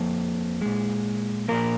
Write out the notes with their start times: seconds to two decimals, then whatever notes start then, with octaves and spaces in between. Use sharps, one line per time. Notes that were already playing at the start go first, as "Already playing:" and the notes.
Already playing: F2 A#3
0.61 A#2 G#3
1.48 A#2 F3 A#3 A#4